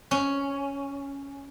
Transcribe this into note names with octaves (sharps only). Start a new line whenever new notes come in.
C#4